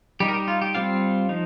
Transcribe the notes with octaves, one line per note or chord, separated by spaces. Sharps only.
G3 D#4 G4
A#4
G4
F4
G4
G3 C4 F4 F5
F3 D#4